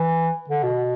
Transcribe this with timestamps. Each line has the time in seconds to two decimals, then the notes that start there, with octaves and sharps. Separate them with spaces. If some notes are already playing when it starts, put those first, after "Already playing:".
Already playing: E3
0.49 D3
0.63 B2